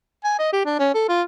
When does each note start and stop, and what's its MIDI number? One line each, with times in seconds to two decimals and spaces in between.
0.25 0.36 80
0.39 0.51 75
0.53 0.63 67
0.66 0.74 62
0.79 0.90 61
0.95 1.09 69
1.09 1.23 65